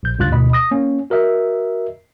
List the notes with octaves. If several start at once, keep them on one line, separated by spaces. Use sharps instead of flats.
A#1 G6
C#2 G2 F4 F#6 A6
G#1 D2 B2 D#5 B5
D#6 A#6
A#3 C#4
F#4 A#4 D#5 E5